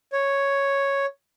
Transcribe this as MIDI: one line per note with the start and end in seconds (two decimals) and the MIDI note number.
0.12 1.06 73